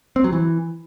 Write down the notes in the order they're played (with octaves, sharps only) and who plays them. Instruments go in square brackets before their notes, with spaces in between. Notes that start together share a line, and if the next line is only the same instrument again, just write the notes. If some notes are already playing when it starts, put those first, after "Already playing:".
[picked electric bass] C4
F#3
E3